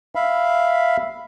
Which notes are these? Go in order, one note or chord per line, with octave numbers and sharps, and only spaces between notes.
E5 F5 B5